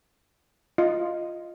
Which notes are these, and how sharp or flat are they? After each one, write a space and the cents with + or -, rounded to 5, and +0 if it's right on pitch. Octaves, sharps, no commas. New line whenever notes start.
F4 +0 D#5 +0